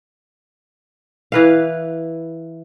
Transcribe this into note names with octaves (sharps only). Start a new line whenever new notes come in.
E3 B4 F5